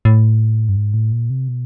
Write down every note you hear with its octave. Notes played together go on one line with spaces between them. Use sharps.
A2
G2
G#2
A2
A#2
C3
B2